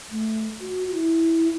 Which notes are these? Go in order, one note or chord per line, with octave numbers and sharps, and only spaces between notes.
A3
F#4
F#4
E4